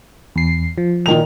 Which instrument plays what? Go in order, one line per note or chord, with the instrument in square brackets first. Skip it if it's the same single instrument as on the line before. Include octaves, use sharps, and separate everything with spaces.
[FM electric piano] E2 C7
F3
[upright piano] A#2 D#3 F7